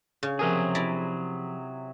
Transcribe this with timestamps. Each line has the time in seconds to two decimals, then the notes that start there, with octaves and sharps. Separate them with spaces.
0.23 C#3
0.39 C3 F3 F#3 G#4 A#4 G#5
0.75 E4 D5 A#5